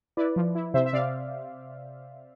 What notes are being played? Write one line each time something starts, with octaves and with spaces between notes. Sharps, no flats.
E4 B4 D5
F3
E4
C3 C5 E5
E5
C3 D5 F5